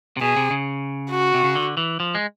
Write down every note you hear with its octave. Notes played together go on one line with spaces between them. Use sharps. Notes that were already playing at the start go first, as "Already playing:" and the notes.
C3
B2 G#4
C3
C#3
F#4
C3
C#3
D3
E3
F3
G#3